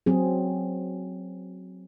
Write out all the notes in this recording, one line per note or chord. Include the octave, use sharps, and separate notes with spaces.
F#3 C4 G#4